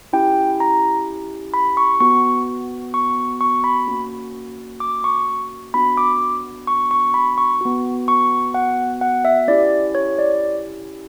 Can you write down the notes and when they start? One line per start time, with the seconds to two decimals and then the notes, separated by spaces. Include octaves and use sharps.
0.13 C#4 E4 G4 G5
0.60 A#5
1.54 B5
1.77 C#6
2.00 B3 F#4 C#6
2.94 C#6
3.41 C#6
3.64 B5
3.87 A#3 C#4 F#4
4.80 D6
5.04 C#6
5.74 B3 D4 F#4 B5
5.97 D6
6.67 C#6
6.91 C#6
7.14 B5
7.38 C#6
7.61 B3 F#4
8.08 C#6
8.54 F#5
9.01 F#5
9.25 E5
9.48 C#4 E4 G4 D5
9.95 C#5
10.19 D5